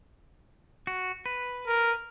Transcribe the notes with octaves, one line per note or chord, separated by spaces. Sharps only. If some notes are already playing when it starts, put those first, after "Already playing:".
F#4
B4
A#4